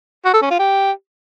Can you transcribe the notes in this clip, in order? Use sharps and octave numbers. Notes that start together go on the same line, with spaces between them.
F#4
A4
C#4
F4
G4